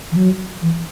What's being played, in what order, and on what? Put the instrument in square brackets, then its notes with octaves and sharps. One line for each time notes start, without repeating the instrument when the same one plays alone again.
[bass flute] E3
F#3
E3